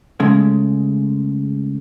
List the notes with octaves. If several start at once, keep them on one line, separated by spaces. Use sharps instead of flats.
C#3 G#3 A3